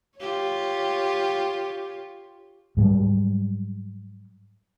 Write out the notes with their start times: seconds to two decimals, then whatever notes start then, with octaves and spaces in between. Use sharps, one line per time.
0.18 F4 G4 C#5
2.77 G#2 F#3 G3